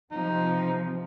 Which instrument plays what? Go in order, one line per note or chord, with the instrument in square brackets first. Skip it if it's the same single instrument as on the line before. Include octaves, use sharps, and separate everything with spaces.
[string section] C3 F3 [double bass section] E3 C4 [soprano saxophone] D#4